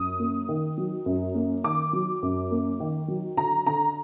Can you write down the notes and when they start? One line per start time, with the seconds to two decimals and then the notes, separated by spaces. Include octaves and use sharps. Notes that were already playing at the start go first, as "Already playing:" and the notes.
Already playing: F#2 D#6
0.19 A#3
0.49 D#3
0.78 F#3
1.06 F#2
1.35 A#3
1.64 D#3 D6
1.93 F#3
2.23 F#2
2.51 A#3
2.80 D#3
3.08 F#3
3.37 D3 A#5
3.67 D3 A#5